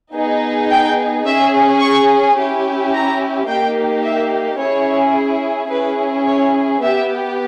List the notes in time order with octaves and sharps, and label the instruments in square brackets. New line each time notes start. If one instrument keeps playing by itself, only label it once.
[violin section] B3 D#4 G#4
G5
C#4 G#4 E5
C#6
C#4 E4 G4
A#5
A#3 D#4 G4 G5
E5
C#4 E4 G#4 C#5
C#4 E4 G#4 B4
C#5
B3 G4 E5